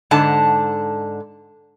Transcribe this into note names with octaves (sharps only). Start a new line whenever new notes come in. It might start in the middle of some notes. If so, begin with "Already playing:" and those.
G#2 D3 A5